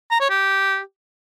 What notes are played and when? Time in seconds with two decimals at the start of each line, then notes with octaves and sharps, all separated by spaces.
0.11 A#5
0.20 C#5
0.30 G4